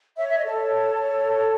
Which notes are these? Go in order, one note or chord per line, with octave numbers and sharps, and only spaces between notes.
C#5 E5
E5
D#5
A4 C#5